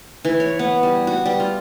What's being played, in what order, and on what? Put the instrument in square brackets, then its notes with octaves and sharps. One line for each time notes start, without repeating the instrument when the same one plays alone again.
[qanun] E3
C#5
B3
G3
F#4
G3
F4